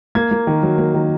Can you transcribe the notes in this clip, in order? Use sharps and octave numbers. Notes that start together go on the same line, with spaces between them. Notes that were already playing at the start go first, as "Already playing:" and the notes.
A#3 G#6
A#3
D#3
F#3
A#3
D#3